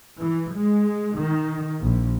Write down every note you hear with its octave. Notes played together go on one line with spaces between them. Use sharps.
E3
G#3
D#3
A#1